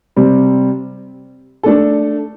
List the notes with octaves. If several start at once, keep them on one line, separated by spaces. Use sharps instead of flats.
C3 G3 C4
A3 D4 A4